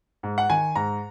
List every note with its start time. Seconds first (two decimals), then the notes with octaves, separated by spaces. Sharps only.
0.23 G#2
0.38 F#5
0.50 D#3 G#5
0.76 G#2 A#5